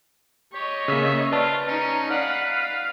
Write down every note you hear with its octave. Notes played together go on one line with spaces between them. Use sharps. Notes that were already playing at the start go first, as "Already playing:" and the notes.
G4 C#5 D#5
C#3 A#3 E5
F4 B4 D5 A5
C#4 D#4
B4 D5 F5 F#5
F5